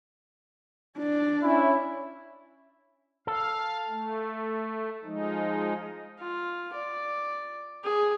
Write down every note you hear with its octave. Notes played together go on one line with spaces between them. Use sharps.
D4
C#4 E4
A4 F5
A3
F3 G#3 D#4
F4
D5
G#4